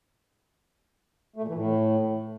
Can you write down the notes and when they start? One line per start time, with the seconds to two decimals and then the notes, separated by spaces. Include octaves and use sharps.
1.36 A3
1.42 A#2
1.48 E3
1.55 A2